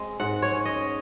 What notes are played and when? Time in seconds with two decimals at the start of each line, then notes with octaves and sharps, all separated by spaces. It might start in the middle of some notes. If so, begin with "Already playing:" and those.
Already playing: G#3 C4
0.20 G#2 F#5
0.42 C#5
0.53 C#4
0.65 D#5